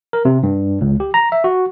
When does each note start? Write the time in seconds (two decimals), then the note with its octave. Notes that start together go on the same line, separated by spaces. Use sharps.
0.13 A#4
0.25 C3
0.43 G2
0.81 C#2
1.00 G4
1.14 A#5
1.32 E5
1.44 F#4